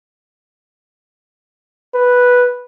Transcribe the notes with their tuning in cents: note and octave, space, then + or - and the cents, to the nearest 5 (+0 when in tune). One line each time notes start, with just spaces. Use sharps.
B4 -5